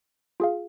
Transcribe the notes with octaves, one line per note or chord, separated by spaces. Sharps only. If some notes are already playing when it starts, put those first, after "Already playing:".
F4 G#4 F5